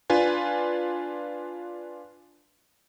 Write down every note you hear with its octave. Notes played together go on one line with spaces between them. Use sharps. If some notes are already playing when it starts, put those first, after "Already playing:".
D4 F4 B4 G#5